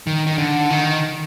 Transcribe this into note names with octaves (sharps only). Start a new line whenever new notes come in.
D#3
D#3
D3
D#3